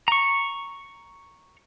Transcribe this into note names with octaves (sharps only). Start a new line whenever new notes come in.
A#5 C#6